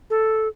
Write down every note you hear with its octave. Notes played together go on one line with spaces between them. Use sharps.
A4